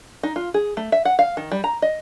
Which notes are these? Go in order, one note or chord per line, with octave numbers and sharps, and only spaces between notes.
D#4
F4
G#4
A3
E5
F#5
F5
D#3
G3
A#5
D#5